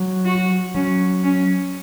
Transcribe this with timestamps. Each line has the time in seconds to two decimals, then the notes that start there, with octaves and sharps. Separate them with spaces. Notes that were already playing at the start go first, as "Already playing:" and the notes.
Already playing: F#3
0.26 F#4
0.75 F#3 C#4
1.24 C#4